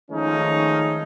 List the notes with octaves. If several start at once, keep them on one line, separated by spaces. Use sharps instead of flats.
D#3 F3 G#3 A3 C#4 D#4